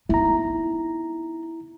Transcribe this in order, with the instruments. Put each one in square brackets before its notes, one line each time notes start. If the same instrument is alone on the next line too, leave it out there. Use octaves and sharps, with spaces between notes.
[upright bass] B3 D#4 [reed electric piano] E4 A#5